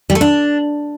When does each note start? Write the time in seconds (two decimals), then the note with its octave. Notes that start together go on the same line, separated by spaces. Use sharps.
0.10 G3
0.15 A3
0.21 D4